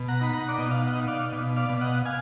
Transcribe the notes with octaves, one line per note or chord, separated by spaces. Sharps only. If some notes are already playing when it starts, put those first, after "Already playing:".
Already playing: B2
F#5 A#5
D#4 B5
F#5 A#5
D5
B2 D#5
F5
D#5 F#5
D#4
D5 F5
B2
D5 F5
B2
D#5 F#5
F5 G#5